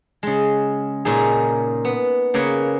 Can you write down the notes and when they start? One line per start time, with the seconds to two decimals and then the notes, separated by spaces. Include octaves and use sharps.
0.23 C#3 G#3
1.05 A#2 C#3 D#4 G#4
1.85 B3
2.34 C#3 A#3 B4 C#5